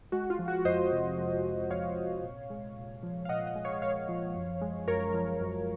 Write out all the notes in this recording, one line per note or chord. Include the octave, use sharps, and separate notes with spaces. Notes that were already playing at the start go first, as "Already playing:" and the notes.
G#3 F#4
F4
F3
F#4
F2 C5 D#5
C3
G#3
F3
F2 C#5 F5
C3
A#2
G#3
A#2
F3
F5
A#2 D#5 F#5
D#5 F#5
G#3
C#5 F5
A#2 C#5 F5
F3
F#2
G#3
F#2 A#4 C#5
F3
F#2